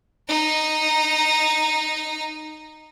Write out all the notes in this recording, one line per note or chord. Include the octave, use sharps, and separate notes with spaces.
D#4 A#5